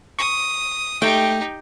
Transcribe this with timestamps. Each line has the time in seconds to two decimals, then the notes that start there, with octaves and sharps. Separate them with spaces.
0.19 C#6 D#6
1.02 A3 D#4 G4 G5